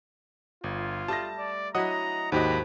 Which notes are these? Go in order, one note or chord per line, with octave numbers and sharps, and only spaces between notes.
G1 F4
G3 A3 D#5 A5 A#6
D5
F#3 D4 E4 D#5 F#5 A#5 D#6
D#2 G#2 F#4 G4 A#4 D#5 B5